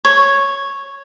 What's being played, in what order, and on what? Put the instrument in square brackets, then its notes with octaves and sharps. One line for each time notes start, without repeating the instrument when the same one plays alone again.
[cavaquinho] C#5